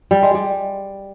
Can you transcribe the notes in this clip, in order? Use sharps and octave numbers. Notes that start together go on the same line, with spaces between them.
G3
G#3
G3